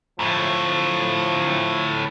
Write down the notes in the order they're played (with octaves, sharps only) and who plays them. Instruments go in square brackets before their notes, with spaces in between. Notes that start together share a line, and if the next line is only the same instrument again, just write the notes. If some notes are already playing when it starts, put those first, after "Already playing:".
[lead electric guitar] D2 A2 [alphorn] F3